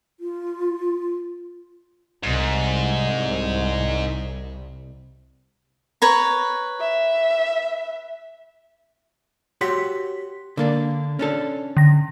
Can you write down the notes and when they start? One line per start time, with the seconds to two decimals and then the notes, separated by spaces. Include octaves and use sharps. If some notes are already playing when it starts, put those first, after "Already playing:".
0.20 F4
2.23 C2 G#2
6.02 B4 C#5 A#5
6.80 E5
9.61 F#4 G4 C#5 C6 B6
10.57 D3 A#3 D4
11.19 C#4 D4 A4
11.77 D3 A#6